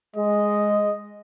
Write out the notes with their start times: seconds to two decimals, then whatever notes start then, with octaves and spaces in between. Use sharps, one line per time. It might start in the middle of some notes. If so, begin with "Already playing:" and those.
0.16 G#3 D#5